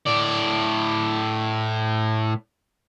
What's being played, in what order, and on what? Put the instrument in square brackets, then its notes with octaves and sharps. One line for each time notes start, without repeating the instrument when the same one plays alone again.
[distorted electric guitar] A2 D5